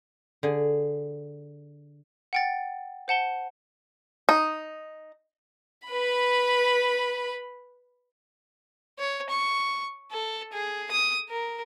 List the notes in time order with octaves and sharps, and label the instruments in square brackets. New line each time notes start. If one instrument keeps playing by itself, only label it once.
[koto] D3 G#4
[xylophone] F#5 G5 A6
C5 F#5 A5 G7
[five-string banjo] D#4
[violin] B4 B5
[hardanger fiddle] C#5
C#6
A4
G#4
D#6
A#4